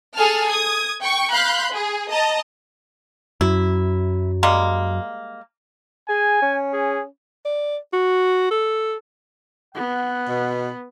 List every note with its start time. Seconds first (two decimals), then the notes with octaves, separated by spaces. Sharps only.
0.16 G#4 A4 G#5 A5 F6
0.47 D#6 G#6
1.00 G5 C#6
1.32 F5 B5 C6 F#6 G6
1.73 G#4
2.11 D#5 A5 A#5
3.41 F#2 F#3 E4
4.43 G3 G#3 A#3
6.09 G#4 G#5
6.42 C#4
6.73 G#4
7.45 D5
7.93 F#4
8.51 A4
9.75 B3 F#5
10.28 B2